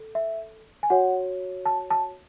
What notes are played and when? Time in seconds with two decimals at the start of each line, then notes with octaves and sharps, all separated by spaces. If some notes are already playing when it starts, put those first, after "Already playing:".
Already playing: A4
0.15 E5
0.83 G#5
0.90 F#4 C#5 F#5
1.66 A5
1.91 A5